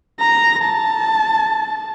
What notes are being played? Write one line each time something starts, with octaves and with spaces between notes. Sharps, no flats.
A#5
A5